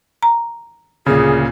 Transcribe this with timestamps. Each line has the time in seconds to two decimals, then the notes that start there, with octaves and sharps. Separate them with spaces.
0.23 A#5
1.06 D2 A#2 C#3 G#4